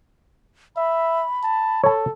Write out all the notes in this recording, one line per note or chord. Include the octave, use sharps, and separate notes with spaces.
E5 B5
A5
A4 C#5 A5